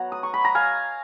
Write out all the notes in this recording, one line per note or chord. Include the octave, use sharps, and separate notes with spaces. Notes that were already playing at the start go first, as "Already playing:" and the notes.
Already playing: F#3 B3 F#5 A#5
D#6
C#6
B5
A#5
F5 G#5